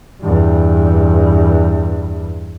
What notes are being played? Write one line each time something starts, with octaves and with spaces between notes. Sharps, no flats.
E2 G2